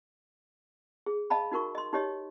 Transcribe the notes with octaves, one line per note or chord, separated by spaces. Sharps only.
G#4
D#5 F5 A5 B5
D#4 F#4 A#4 C#6
D#5 C6
D#4 G4 C#5 D#5